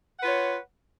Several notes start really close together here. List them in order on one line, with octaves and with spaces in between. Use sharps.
F#5 B4 F4 C#5